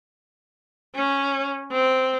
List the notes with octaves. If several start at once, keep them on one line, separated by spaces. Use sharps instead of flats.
C#4
C4